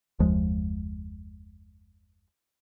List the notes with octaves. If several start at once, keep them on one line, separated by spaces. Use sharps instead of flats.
F#1 D#2 F3 G#3